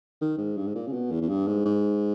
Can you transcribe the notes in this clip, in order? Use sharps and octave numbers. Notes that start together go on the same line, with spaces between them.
D#3
G#2
G2
G#2
A#2
C#3
B2
E2
E2
G2
G#2
G#2